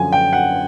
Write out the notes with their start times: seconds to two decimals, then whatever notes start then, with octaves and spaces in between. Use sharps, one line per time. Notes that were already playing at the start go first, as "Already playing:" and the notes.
Already playing: F#2 D3 F3 G#5
0.13 G5
0.33 F#5